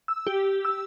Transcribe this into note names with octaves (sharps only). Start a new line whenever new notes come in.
E6
G4
E6